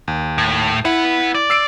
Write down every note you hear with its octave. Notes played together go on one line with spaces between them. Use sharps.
D#2
A2
E4 B4 F#5
D5
E6 C7 D7